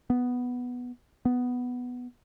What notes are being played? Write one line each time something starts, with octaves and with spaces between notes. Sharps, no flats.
B3
B3